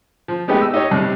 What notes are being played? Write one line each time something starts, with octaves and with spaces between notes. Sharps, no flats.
F3
G#3 A3 B3 D#4 G4
E6
D#4 G4 C#5
G2 C3